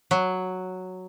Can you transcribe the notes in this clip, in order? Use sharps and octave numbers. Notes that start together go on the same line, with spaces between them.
F#3